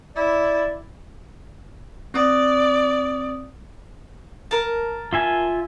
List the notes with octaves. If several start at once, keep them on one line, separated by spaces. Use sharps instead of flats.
E4 D5
C4 D5 D#6
A#4 A5
F4 E5 G#5